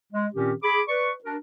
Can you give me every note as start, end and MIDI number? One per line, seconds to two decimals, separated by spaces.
0.12 0.26 56
0.34 0.53 46
0.34 0.53 51
0.34 0.53 60
0.34 0.53 61
0.34 0.53 67
0.63 0.80 68
0.63 0.80 83
0.63 0.80 86
0.88 1.12 71
0.88 1.12 74
0.88 1.12 85
1.24 1.36 62
1.24 1.36 66
1.24 1.36 70